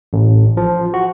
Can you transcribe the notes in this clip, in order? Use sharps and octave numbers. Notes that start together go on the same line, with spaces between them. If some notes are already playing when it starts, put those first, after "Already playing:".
A1
F3
F#4